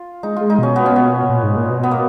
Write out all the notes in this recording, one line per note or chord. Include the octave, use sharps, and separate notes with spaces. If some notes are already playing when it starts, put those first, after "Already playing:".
Already playing: F4
G#3 D#4
G#3 F4
D#4
B2 C#4
B3
C#4
B3
A#2
G#2
A#2
B2
B3
A#3